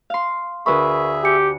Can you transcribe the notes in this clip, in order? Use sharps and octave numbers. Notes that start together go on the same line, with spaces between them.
F5 C6
D2 G#4 A#4 B4 E5 B5 C#6
G4 G#5 C#7